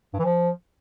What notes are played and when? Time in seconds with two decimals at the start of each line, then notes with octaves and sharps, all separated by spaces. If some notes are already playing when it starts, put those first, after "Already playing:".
0.14 G2
0.19 E3
0.25 F3